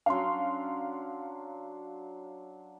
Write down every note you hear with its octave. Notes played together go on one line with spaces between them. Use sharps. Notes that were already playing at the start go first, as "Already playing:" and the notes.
F#3 C#4 D4 F5 C6